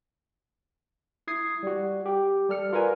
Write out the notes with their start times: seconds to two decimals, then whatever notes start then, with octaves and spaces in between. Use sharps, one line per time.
1.27 E4 D#6 G#6 C7
1.63 G3 F#4
2.06 G4 G5
2.49 G3 A4 F6 C#7
2.72 F4 F#4 A#4 B4 D5 G#5